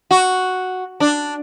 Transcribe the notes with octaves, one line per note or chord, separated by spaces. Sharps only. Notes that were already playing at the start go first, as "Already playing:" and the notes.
F#4
D4